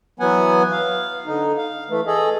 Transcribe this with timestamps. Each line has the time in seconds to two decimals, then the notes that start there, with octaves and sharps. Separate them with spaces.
0.20 E3 F#3 B3 F#5 G#5
0.72 F5
1.26 D3 D#4
1.57 F5
1.89 E3 A3
2.07 G#4 A4 D#5